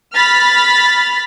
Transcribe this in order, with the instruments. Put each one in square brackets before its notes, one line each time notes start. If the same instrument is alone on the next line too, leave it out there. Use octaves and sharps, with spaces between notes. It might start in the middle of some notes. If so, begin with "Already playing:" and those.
[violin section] B5 F6 A6 B6